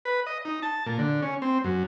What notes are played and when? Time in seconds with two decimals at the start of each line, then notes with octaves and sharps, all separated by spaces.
0.05 B4
0.27 D#5
0.45 D#4
0.63 A5
0.86 A#2
0.99 D3
1.22 C#4
1.42 C4
1.64 F#2